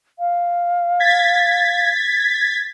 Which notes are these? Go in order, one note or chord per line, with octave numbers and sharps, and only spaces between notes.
F5
G#6 A6 B6